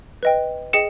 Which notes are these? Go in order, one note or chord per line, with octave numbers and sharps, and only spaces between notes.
B4 D#5 G5
G#4 D#5 G5 C#7 E7